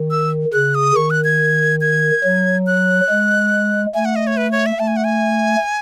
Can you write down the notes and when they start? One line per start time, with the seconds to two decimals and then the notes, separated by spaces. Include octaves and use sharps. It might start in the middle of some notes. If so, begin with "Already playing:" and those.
Already playing: D#3
0.11 E6
0.53 C#3 F#6
0.75 D#6
0.96 D#3 C#6
1.10 F#6
1.24 G#6
1.81 G#6
2.24 F#3
2.67 F#6
3.10 G#3
3.95 A3 G#5
4.05 F#5
4.16 D#5
4.27 C#5
4.37 B4
4.52 C#5
4.66 E5
4.79 A3 A5
4.87 G#5
4.97 F#5
5.04 G#5